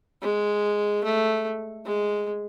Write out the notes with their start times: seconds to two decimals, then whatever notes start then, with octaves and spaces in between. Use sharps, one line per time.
0.22 G#3
1.04 A3
1.85 G#3